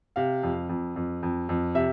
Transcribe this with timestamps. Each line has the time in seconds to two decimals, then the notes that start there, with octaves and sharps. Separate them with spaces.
0.16 C3 F5
0.43 F2
0.69 F2
0.96 F2
1.23 F2
1.49 F2
1.75 C3 E5